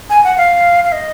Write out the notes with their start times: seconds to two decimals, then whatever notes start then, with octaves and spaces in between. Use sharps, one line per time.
0.10 G#5
0.24 F#5
0.38 F5
0.84 F5
0.92 D#5